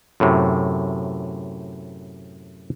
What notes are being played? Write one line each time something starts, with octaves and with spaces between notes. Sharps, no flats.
F#2 A2 C3